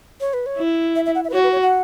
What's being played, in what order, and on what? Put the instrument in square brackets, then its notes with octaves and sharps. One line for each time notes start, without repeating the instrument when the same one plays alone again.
[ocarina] C#5
B4
C#5
[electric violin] E4
[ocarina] E5
E5
F#5
E5
B4
[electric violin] F#4 [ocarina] C#5
[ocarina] B4
C#5
F#5